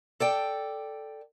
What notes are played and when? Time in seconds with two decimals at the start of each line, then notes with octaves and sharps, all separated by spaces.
0.20 A4 D5 G5